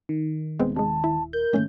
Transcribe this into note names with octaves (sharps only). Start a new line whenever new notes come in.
D#3
D#1 G#3 B3 C4
C3 G#3 A5
E4
A#4 G6
G#2 D#3 A3 A#3 C#4